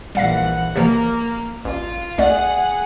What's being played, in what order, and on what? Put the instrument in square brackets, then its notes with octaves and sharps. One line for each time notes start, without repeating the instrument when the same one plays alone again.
[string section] A#1 E3 F#5 [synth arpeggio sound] G3 F5 A#6
[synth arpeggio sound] C3 E3 F3 [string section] A#3
[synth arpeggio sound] A1 [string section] F4
[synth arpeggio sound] C2 A3 D5 [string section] G#4 F#5